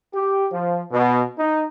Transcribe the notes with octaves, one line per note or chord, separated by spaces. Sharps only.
G4
F3
B2
D#4